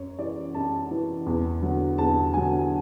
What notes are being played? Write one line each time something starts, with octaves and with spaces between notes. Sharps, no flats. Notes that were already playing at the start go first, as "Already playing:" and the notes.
Already playing: F#2 C#5
E3 D5
F#2 A5
E3
E2
D3 F#3
E2 A5
D3 F#3 G#5